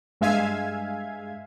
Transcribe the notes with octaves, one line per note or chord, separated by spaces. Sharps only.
G2 G#3 E5 F5 G#5 G#6